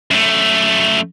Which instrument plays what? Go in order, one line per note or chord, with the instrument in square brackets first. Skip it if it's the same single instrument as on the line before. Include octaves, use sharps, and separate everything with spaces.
[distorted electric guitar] F#2 A3